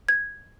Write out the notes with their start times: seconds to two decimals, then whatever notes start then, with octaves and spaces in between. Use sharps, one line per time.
0.09 G#6